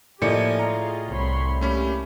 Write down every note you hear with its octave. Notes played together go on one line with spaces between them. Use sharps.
A2 F3 A#3 G4 D5 D#5 G#5 C#7
F4 G#4 D#5 A#5
C2 C#5 B5 C6
A3 A#3 C#4 G4 B5